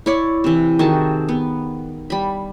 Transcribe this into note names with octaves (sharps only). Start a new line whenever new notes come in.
E4 C#5 D5
C3 E3
D#3 F#4 G#4 A5
B3
G3 B5